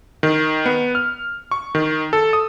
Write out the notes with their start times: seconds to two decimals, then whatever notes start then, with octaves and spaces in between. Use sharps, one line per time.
0.23 D#3
0.66 B3
0.95 F6
1.51 C#6
1.75 D#3
2.13 A4
2.33 D#6